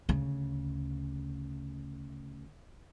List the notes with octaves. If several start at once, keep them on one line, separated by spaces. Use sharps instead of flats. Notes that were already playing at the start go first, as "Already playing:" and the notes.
D2 C#3